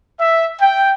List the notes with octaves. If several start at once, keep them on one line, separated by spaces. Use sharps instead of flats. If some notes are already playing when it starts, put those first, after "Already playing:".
E5
G5